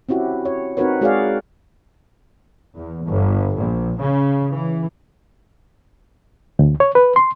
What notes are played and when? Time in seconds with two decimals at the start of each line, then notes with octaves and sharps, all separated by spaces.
0.09 C4 C#4 E4 F#4 G4
0.45 C#5
0.77 C4 D#4 F#4 A#4 B4 C#5
1.01 G#3 F#4 G#4 C#5 D5 F5
2.74 E2
3.06 G1
3.57 A#1
4.00 C#3
4.52 E3
6.59 D2
6.80 C#5
6.95 B4
7.16 C6